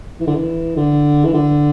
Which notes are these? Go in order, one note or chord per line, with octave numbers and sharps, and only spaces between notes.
E3
D3
E3
D3
E3
D3